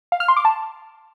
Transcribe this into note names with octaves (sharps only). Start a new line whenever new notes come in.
F5
F6
C6
D6
A5